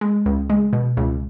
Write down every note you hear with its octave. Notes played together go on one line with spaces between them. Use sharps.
G#3
C#2
G#3
B2
C#2